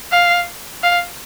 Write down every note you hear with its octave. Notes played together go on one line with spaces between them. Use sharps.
F5
F5